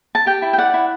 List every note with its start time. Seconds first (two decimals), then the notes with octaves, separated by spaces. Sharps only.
0.15 A5
0.26 G4 G5
0.42 E4
0.53 G5
0.58 D5 F#5
0.74 E4